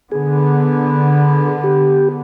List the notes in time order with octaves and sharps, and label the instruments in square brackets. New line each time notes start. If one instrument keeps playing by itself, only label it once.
[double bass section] D3 B3 [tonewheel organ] G#4
[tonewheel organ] G4